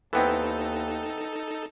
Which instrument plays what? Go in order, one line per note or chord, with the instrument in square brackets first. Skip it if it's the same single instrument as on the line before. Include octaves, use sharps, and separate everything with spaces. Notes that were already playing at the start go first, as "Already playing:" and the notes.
[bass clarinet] D#2 [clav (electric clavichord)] E3 B3 C4 [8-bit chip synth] D#4 A4 [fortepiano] B4 G5